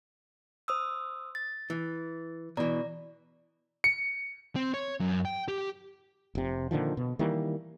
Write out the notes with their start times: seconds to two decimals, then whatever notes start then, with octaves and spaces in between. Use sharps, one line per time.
0.68 C5 D#6 E6
1.35 A6
1.70 E3
2.57 B2 E3 D5 A#5
3.84 C#7
4.56 C4
4.74 C#5
5.00 F#2
5.25 G5
5.48 G4
6.35 F1 C3
6.71 A#2 D3 D#3 F3
6.97 B2
7.19 D#3 E3 G3 A#3